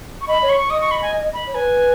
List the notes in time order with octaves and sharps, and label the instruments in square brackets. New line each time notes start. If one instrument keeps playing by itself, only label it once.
[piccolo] C#6
[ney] D#5 [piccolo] B5
[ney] C#5
[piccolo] C#6
[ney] D#5 [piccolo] D#6
[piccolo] C#6
B5
G#5
B5
[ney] C#5
[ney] B4 [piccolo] G#5